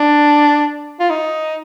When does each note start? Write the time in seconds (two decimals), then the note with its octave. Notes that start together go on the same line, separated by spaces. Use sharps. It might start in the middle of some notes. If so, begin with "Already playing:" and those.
Already playing: D4
1.00 F4
1.10 D#4